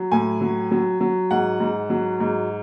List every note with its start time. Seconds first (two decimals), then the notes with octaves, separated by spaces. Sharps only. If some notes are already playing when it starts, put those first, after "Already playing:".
Already playing: F#3
0.12 A2 G#5
0.41 F#3
0.71 F#3
1.01 F#3
1.31 G#2 F#5
1.60 G#2
1.90 F#3
2.20 G#2